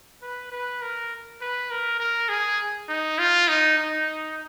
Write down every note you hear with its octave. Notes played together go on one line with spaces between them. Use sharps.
B4
B4
A#4
B4
A#4
A#4
G#4
D#4
F4
D#4
D#4